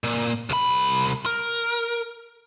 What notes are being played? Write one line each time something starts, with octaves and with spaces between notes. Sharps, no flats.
A#2
C2 B5
A#4